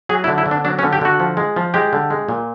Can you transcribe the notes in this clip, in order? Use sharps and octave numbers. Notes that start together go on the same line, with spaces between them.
F#3 G#4
E4
D3
E4
D3
D4
F#3 D4
C#4
D3
G4
D3 F#4
F3
G#3
F3
G#3 G4
D3
G#3
A#2